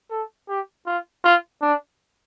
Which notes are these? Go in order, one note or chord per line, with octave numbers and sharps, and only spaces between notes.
A4
G4
F4
F4
D4